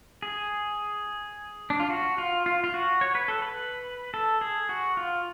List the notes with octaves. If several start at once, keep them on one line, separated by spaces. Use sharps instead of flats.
G#4
D4
F4
F#4
F4
F4
F4
F#4
C#5
B4
A4
B4
A4
G#4
F#4
F4